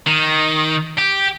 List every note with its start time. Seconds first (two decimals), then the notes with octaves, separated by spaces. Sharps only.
0.06 D#3
0.98 G4